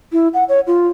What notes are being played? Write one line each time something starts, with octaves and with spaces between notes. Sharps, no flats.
E4
F#5
C#5
F4